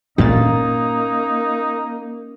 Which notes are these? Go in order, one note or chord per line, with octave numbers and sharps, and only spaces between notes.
G1 A#2 A#3 C#4 D#4 A6